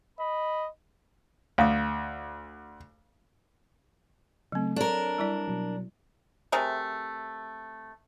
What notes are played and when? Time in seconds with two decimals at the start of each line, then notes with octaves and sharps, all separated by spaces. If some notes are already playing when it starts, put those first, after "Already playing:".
0.19 D#5 B5
1.58 D2 F5 D#6
4.52 C#3 F#3 A3 C4
4.76 D4 A4 A#4 C#5
5.18 G3 E4 D5
5.48 B2 F#3
6.52 C3 A3 G#4 A#4